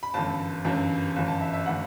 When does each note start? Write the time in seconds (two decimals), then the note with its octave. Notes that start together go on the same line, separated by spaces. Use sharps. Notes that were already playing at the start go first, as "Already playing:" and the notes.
0.03 B5
0.14 G1 F#2 E3 A5
0.65 G1 F#2 E3
1.16 G1 F#2 E3
1.28 A5
1.41 E5
1.53 E5
1.66 E3 F#5